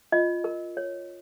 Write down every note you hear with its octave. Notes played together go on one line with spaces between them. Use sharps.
F4 D#5
A#4
C#5